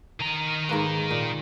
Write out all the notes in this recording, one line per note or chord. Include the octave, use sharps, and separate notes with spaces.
D#3 A#5
G#2 A#3 B4
A#2